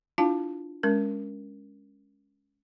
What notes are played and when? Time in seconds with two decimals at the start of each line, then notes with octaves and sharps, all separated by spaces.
0.18 D4 E4 F4 F5 A5
0.83 G#3 C#4 A#4